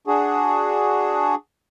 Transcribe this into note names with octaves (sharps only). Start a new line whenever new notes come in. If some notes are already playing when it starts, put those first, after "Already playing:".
D4 F#4 G#4